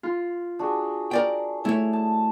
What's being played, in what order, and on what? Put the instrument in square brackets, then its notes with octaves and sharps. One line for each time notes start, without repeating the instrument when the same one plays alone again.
[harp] F4
[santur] D4 F#4 G#4
[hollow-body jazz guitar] A#4 D5 G5
[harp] A3 [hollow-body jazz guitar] E4 C#5
[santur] A5